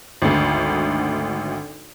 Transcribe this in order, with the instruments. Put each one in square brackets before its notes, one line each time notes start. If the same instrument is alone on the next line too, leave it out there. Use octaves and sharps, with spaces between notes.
[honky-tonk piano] G#1 D2